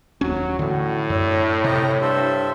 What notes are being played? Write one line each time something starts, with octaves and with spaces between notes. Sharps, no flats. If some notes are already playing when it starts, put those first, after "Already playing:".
D#1 D#2 F#3 C#4
A2 D3 E3 F#4
F#2 D4 C#5 E5
C3 G4 D#5 A#5
G2 A4 C5 E5